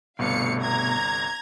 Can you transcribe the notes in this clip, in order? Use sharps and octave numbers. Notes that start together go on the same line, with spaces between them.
G1 C2 B2 A3 F5 C#7
A#5 G#6